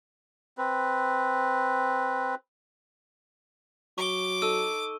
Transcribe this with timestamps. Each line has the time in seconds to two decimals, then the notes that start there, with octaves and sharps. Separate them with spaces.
0.58 C4 B4
3.98 F#3 C#6 D6 G7
4.42 D#4 A4 E6 D#7